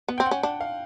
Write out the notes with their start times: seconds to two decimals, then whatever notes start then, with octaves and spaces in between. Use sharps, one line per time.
0.08 B3 F#5
0.18 C4 G5
0.26 F#5
0.31 C#4
0.43 D4 F#5
0.60 F5